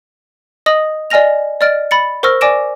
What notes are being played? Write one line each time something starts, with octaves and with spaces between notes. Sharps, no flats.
D#5 D#6 A#6 F#7
D5 D#5 G#5 F6 A#6 F7
D5 D#5 F6 A6 D7
B5 A6 C#7
A#4 C5 C#6 E6 F6 A#6
D5 G#5 D6 A#6 D7 E7